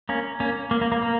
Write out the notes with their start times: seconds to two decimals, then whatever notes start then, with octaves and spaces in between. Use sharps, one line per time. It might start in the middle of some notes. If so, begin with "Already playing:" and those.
0.09 A#3 C#4
0.40 A#3 C#4
0.71 A#3
0.81 A#3
0.92 A#3
1.02 A#3